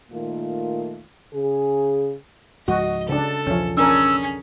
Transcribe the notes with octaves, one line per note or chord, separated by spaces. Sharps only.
A#2 D#3 A3 A#3 F4
C#3 G#4
C#2 G#2 F3 F#4 D#5
C#3 D4 A4
B1 E2 F3 C#4
C#4 D4 G#4 A#4 E6